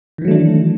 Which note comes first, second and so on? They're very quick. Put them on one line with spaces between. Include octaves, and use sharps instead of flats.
D#3 E3 F#3 A3 D4